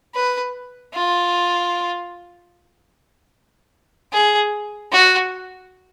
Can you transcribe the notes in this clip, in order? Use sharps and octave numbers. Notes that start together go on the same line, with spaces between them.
B4
F4
G#4
F#4